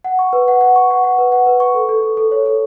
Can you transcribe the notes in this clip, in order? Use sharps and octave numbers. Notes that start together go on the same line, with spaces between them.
F#5
C#6
B4
F#5
F#5
C#6
F#5
F#5
B4
F#5
B4
C#6
A4
A4
A4
A4
C#5
A4